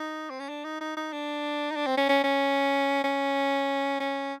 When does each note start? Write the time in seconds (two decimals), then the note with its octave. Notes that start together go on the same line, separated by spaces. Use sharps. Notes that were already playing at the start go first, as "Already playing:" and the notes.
Already playing: D#4
0.30 C4
0.40 C#4
0.49 D4
0.65 D#4
0.81 D#4
0.97 D#4
1.13 D4
1.71 D#4
1.76 D4
1.87 C4
1.97 C#4
2.09 C#4
2.24 C#4
3.04 C#4
4.00 C#4